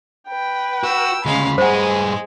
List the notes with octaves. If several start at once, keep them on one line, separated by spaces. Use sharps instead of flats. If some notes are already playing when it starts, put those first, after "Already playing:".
B4 G5
F#4 E6
D2 C#3 G#3 F5 B5
G2 G#3 G#4 C5 F#5